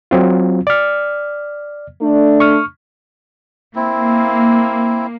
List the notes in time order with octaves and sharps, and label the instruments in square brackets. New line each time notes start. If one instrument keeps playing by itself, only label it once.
[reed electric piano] F#3 C4 F4
D5 F6
[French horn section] A3 D4
[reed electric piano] C#6 F6
[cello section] A#3 [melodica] C4 E4